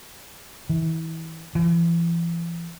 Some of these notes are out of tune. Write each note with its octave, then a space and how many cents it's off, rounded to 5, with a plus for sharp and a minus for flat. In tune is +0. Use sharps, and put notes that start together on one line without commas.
E3 -30
E3 +40